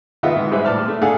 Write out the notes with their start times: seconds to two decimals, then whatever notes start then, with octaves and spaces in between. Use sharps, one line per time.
0.23 D#3 B3 F4 D#5 E5 F#5
0.36 G#2
0.51 G3 G#3 G4 B4 C5 E5
0.65 A2 D5 A5 F6
0.88 A3
1.01 A3 D4 G#4 A4 F5 F#5